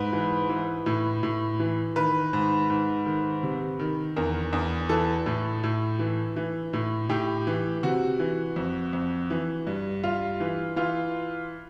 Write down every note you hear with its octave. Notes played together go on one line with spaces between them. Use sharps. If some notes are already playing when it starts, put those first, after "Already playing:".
Already playing: G#2 B4
E3
E3
A2
A2
E3
D#3 B4
G#2
G#2
D#3
C3
D#3
E2 A#4
E2
E3 A4
A2
A2
E3
E3
A2
A2 G4
E3
C3 F#4
E3
F2
F2
E3
G2
G2 F4
E3
E3 F4